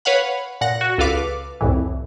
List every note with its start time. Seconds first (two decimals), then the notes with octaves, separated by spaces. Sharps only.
0.05 B4 C#5 F5 F#5 B5
0.61 A#2 F#5 A#6
0.81 F#4
0.98 C#2 A4 B4 F5 D6
1.61 C2 F2 A2 E3